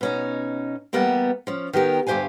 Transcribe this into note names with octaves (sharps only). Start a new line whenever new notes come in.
B2 C#4 D#4
E2 G3 A#3 B3 F#5
F3 C#4
D#3 B3 G4 A#4
D2 G2 G4 C5 F5 G#5